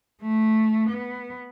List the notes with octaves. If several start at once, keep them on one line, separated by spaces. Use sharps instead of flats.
A3
B3